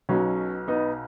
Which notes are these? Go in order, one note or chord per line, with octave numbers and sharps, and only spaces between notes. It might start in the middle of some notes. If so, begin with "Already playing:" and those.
B1 B2 F#3 C#4
B3 D#4